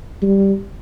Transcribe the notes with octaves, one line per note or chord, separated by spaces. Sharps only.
G3